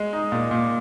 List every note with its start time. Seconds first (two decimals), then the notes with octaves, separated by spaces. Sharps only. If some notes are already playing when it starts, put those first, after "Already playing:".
Already playing: G#3
0.13 D#4
0.32 A#2
0.51 A#2